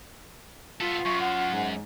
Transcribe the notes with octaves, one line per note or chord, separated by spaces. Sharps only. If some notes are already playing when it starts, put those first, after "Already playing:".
B3 F4 A4
F#2 C#6
F#5
G#2